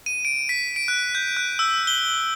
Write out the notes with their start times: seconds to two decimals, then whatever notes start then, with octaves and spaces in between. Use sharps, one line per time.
0.06 D#7
0.25 D7
0.49 B6
0.76 D7
0.88 F#6
1.15 G6
1.37 F#6
1.59 E6
1.87 G7